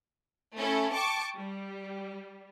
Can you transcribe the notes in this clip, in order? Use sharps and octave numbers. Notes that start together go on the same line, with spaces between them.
A3 C#4 E4 A4
G5 A5 C#6 D6
G3